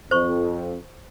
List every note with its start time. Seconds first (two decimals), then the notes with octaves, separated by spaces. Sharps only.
0.11 F2 C5 C#6